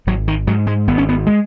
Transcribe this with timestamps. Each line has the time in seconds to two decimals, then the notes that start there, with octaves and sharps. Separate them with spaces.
0.07 G#1 F#3
0.28 D#3
0.47 G#2 F#3
0.67 G#3
0.87 G#1 B3
0.98 C#4
1.09 B3
1.27 G#3